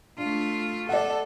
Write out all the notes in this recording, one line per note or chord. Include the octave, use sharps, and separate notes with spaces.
A3 D4 F4
A4 D5 F#5